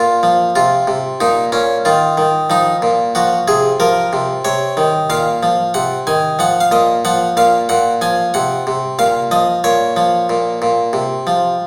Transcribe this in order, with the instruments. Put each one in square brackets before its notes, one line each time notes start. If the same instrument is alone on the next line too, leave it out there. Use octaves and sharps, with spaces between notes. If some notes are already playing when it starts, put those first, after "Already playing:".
Already playing: [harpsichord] A#2 F4
F3
C3 F4
C3
A#2 D#4
A#2 C#4
D#3 F4
D#3
F3 D#4
A#2
F3 F#4
C3 G#4
F3 A#4
C3
C3 C#5
D#3
A#2 F5
F3
C3 F#5
D#3 G#5
F3 F#5
F5
A#2 D#5
F3 F#5
A#2 F5
A#2 F#5
F3 G#5
C3 F#5
C3
A#2 F5
F3 D#5
A#2 C#5
F3
A#2
A#2
C3
F3